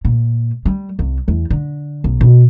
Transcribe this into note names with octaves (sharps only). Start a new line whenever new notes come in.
A#2
G3
C2
E2
D3
B1
B2